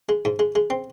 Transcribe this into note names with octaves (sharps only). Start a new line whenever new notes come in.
G#3
G#2
G#3
G#3
C4